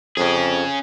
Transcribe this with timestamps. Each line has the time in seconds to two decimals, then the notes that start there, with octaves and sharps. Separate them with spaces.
0.17 F2 C#4 G#4